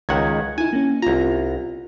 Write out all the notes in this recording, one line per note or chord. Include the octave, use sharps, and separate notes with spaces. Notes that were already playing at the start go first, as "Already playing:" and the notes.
C#2 D#3 F#5 G#6
D#4 E4 G#5
A#3 C#4
C2 F4 A#5